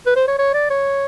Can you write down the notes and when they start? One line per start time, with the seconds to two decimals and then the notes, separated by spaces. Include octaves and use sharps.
0.06 B4
0.16 C5
0.28 C#5
0.39 C#5
0.54 D5
0.70 C#5